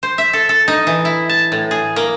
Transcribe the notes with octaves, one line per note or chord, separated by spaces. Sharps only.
C5
E5
A4
A4
D#4
E3
E4
A5
A2
G#4
A#3